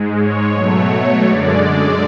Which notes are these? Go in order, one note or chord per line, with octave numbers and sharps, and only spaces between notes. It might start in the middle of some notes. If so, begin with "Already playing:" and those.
Already playing: G#2 G#3
C#5
B2 F#3 A3
F#2 D3 G#3 D5
D5